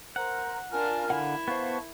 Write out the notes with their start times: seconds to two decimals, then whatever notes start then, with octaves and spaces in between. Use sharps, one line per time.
0.16 A#4 C5 F#5 A#5
0.71 D4 F4 A#4 G#5 F6
1.10 D3 E4 F5 F#5
1.48 B3 C5 F5 A5 C#6